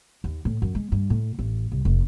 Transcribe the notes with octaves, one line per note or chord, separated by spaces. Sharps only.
D#2
A2
F#2
G#3
G2
A2
A1
C2
F1